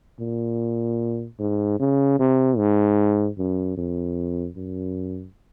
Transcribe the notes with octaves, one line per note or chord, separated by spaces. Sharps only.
A#2
G#2
C#3
C3
G#2
F#2
F2
F#2